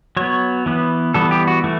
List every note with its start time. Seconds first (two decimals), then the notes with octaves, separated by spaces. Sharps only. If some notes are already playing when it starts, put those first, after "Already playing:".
0.17 F#3 B3 C#5
0.66 E3 B3
1.14 E3 G3 B3 A4
1.31 G4
1.47 F#4
1.64 E3 A3